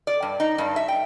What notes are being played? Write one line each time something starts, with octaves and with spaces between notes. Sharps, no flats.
D5
G2
D#4
G2
E5
G5